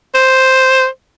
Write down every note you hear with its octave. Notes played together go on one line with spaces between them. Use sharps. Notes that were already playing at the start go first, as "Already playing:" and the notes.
C5